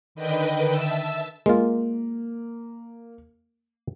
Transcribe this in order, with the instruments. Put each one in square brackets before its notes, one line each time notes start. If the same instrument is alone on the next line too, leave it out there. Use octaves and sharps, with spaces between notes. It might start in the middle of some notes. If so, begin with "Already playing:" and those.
[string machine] D3 D#3 B4 D#5 G5
E5 A5 E6
[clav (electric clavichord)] G#3 F4 [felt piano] A#3